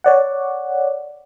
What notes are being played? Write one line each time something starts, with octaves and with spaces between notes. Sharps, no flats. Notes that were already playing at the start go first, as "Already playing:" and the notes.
C#5 D5 F#5